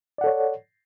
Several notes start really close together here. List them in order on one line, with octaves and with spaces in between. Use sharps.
D5 F#5 A4 C#5